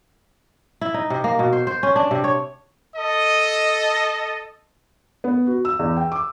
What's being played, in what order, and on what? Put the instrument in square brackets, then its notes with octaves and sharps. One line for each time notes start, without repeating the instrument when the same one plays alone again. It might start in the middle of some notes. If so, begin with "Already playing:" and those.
[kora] E4
D#4
C3
A#3
B2
C5
C5
C#4
D4
C3
C#5
[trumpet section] A4 D#5
[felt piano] B3
F#4
E6
E2
G5
D6